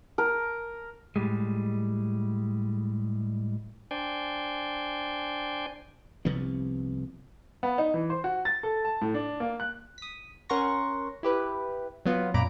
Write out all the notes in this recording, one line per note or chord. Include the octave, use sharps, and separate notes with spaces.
A#4
A2 G3 G#3
D4 C5 D5 G5 G#5
C2 C3 F3 B3
B3
D#4
E3
C5
F#4
A6
A4
A5
A2
D4
A#3
F#6
D#6 B6
C#4 A#4 F#5 C6 C#6 A#6
E4 G4 B4
F#3 B3 F4
F#2 A#2 A#5 B5 D6 D7